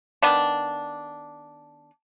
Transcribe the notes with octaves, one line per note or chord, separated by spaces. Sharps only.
D#3 B3 D4